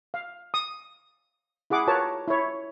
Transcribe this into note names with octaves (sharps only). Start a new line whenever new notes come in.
F5
D#6
E4 G#4 F#5 D6
F4 F#4 A#4 B4 C#5 A5
E4 C#5